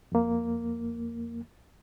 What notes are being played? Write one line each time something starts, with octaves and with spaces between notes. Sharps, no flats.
F2 A#3